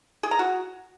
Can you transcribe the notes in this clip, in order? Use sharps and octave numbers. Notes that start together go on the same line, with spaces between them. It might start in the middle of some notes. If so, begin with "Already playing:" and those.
G#4
A#5
F#4